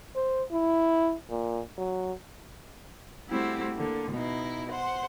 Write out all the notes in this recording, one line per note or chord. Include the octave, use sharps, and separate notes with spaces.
C5
E4
A#2
F#3
G3 A3 C4 E4 F#4 G4
D3 A#3
B2 D#4 E4
C5 F#5 C6